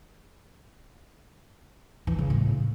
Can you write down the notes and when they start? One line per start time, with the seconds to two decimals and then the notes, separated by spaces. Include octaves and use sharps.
2.07 E3
2.19 C#3
2.30 A2